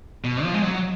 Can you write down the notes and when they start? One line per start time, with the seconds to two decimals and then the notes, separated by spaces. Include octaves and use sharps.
0.24 B2
0.43 F3
0.54 G#3
0.62 F#3